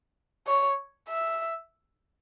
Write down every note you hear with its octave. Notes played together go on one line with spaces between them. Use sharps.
C#5
E5